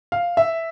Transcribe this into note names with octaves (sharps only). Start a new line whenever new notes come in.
F5
E5